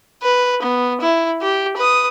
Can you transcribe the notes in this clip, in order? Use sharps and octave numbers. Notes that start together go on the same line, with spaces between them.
B4
B3
E4
G4
B4 D#6